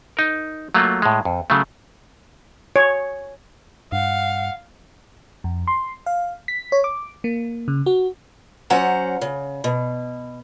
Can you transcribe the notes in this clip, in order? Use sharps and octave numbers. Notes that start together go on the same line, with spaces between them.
D#4 A#4
F#3 A3 A#3 F4
A2 G#3
F2
C#3 F#3 A3
C#5
G2 F5 F#5
F2
C6
F5
B6
C#5
D6
A#3
C#3
F#4
F#3 C#4 C5 F#5 A#5
C#3
B2